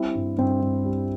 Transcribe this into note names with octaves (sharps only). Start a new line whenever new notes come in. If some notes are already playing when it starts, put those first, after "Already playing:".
Already playing: G3 C4 E4
G2
G2 C4
G2
G3